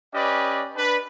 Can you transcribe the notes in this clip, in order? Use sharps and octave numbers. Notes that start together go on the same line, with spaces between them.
C#4 G4 B4 D5 D#5
D4 B4